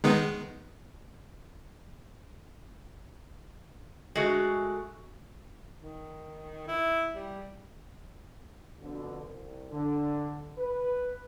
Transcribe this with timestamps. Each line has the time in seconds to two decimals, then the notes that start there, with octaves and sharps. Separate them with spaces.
0.04 D#3 G#3 B3
4.15 G#3 A3 F#4
5.78 D#3
6.67 E4
7.15 G3
8.81 F2 B2 D3
9.23 C2
9.71 D3
10.58 B4